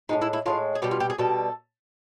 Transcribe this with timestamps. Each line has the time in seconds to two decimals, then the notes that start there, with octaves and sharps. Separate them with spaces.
0.09 A2 F3 G#3 D#4
0.22 E4
0.33 E4
0.46 A2 F3 G#3 F4
0.75 G#4
0.82 B2 G3 G4
0.91 F4
1.00 G4
1.10 G#4
1.18 B2 G3 A4